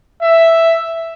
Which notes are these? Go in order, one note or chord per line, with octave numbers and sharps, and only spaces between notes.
E5